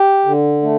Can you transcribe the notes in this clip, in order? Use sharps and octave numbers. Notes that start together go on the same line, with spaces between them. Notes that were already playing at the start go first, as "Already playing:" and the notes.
Already playing: G4
D3
A3